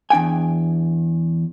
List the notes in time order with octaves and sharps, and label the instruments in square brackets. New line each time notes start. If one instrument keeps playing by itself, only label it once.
[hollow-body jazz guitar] E2 D4 G5 G#5